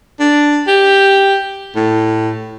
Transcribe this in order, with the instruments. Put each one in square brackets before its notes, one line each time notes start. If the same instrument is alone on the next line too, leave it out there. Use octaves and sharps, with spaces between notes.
[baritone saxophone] D4
G4
A2